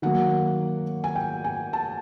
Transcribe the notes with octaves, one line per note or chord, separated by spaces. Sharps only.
D#3 F#3 A#3 F#5
G#5
G5
G#5
A5